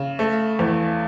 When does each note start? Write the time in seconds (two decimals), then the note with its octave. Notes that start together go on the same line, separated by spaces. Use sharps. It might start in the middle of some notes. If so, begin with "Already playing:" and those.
Already playing: C#3
0.19 A3
0.59 E2